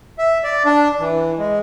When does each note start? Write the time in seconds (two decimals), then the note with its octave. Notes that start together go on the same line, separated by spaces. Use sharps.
0.19 E5
0.43 D5
0.65 D4
0.99 E3
1.38 G#3